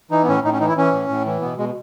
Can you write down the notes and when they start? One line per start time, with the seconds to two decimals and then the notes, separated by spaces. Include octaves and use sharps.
0.11 E3 D#4
0.23 B3
0.28 A2 C#4
0.44 A2 D#4
0.52 C#4
0.60 E3 D#4
0.68 E4
0.77 E3 C#4
0.92 A2
1.09 A2
1.26 E3
1.41 B2 B3
1.58 B2 G#3